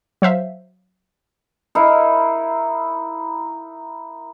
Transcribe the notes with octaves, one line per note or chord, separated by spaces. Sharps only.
F#3 C5 E5 F5
D#4 E4 A#4 F5